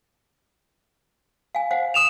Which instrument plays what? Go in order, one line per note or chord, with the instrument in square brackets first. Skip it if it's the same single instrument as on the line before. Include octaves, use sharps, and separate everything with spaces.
[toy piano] F5 G#5
C5 F5 F#5
[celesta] D#6 E7 F7